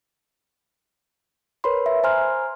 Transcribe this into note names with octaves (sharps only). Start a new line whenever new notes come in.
A#4 B4 C#5 B5 C6
E5
C5 G#5 A#5 C6 F6